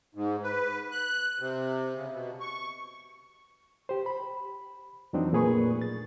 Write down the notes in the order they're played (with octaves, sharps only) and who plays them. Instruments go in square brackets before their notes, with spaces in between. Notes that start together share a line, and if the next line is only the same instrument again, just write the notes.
[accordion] G#2
B4
F#6
C3
C#3
B2
C#6
[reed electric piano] G4 C5
B5
F2 E3 F#3 C4 D4 D#4
F2 A#2 A3 G#4 B4 C#6
A6